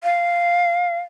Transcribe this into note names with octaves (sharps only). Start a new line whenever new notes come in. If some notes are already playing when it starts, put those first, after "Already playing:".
F5